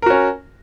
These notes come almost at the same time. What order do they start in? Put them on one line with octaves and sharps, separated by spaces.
A#4 F#4 C#4